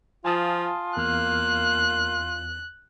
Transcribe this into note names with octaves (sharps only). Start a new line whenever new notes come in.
F3 F4 G#5 A5 D#6
E2 A#3 F6 F#6